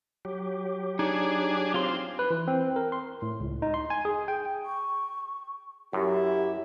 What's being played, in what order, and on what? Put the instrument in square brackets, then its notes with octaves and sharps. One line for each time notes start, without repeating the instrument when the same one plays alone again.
[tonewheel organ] F#3 G4
[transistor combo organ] D4 G#4 [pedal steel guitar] D#4
[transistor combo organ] C4 [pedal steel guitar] F4 C6
[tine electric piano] B4
E3
C4
A#4
C6
A2
C#2
D#4
C6
G#5
G#4
G5
[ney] C#6
[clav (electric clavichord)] F#2 [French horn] E4 [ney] G4